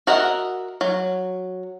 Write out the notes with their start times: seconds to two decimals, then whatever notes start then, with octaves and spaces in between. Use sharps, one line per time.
0.07 F#4 A#4 D#5 E5 F#5
0.81 F#3